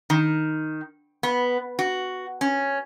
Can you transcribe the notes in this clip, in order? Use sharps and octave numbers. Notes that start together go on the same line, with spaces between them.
D#3
B3
F#4
C#4